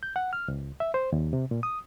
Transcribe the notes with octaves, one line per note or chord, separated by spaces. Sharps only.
G6
F#5
F6
C#2
E5
C5
D#2
C3
A#2
D#6